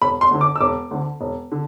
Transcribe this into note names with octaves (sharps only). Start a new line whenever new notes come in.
E1 B5
C6
D2 D3
D6
E6
E1 D6
D2 D3
E1
D3